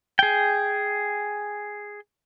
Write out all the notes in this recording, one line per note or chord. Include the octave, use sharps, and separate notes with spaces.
G#4 G5